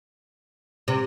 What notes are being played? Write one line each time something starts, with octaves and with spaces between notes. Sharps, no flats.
C3